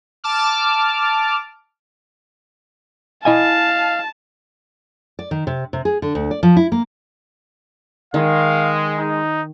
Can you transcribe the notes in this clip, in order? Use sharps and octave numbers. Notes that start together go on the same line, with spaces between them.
A5 D6 F6
E4 D#5 F5 G#5 A5
D5
D#3
C3
C3
G#4
D3
D2
D5
F3
E4
A#3
D#3 G#3 F5
D#4